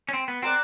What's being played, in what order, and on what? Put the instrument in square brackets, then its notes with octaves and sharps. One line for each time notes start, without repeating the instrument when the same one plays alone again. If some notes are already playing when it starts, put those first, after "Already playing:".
[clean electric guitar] C#4
C4
B3
[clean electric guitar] C4 [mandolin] F#4 A#4 D5